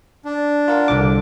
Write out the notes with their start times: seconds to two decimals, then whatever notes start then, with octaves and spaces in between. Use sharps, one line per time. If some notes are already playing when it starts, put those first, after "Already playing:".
0.25 D4
0.68 F4 A#4 F#5
0.88 C2 D3 D6